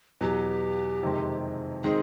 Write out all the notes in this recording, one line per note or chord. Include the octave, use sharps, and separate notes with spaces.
E2 B2 F#3 G4
F2 C3 D#3 G#3 C4
D#3 G#3 C4 D#4 G#4